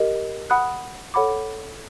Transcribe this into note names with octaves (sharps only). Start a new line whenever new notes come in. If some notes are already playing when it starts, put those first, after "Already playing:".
Already playing: G4 A#4 D#5
F#5 B5 D#6 F#6
A4 C#5 F#5 B5 D6